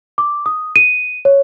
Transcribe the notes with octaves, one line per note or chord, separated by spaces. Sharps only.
D6
D#6
D#7
C#5